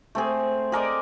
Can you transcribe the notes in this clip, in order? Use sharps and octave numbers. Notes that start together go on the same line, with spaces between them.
A3 C4 G#4
G#4 A#4 D5 D#5